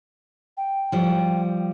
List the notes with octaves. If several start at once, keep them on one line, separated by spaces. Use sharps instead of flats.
G5
F3 G3